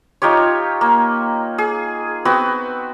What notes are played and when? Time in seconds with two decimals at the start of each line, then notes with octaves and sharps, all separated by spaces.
0.22 D#4 F4 G4 C#5
0.81 A#3
1.58 G#4
2.25 B3 C4 F#4 G5